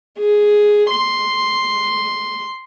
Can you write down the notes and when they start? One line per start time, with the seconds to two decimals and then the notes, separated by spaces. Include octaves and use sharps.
0.18 G#4
0.90 C6